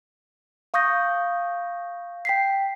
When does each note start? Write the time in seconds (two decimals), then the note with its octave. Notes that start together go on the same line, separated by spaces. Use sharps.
0.74 F5 C#6 D#6 G6 A#6
2.25 G5 B6 C7